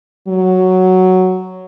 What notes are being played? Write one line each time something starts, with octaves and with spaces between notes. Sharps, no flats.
F#3